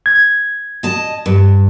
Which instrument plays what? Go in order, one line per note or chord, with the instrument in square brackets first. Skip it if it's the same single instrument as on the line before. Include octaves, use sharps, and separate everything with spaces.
[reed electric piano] G#6
[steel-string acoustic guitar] D#5 A5
G2